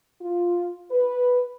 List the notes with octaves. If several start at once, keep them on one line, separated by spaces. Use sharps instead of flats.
F4
B4